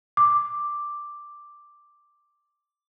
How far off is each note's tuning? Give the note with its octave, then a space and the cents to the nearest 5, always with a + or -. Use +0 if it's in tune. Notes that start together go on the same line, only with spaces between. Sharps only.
D6 +0